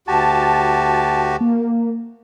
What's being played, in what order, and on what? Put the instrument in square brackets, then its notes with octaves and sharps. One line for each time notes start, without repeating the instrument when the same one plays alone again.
[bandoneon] D2 F#4 G4 [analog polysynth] A5
[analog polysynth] A#3